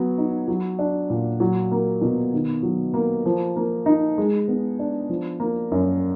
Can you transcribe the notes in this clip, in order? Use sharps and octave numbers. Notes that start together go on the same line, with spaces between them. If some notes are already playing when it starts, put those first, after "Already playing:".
Already playing: F#3 B3
D#4
F#3
D4
A#2
F#3
A#3
B2
D#3
F#3
A#3
F3
A#3
D#4
G#3
B3
D4
F3
A#3
F#2